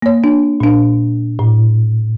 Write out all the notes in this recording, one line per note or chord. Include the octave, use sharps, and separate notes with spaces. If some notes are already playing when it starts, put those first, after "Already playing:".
A#3 C#5
D4
A#2 D4
A2